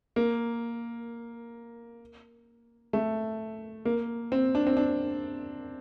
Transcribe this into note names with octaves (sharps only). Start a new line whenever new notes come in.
A#3
A3
A#3
C4
D4
C4
D4